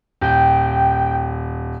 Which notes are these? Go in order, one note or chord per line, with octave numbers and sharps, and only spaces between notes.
D#1 G5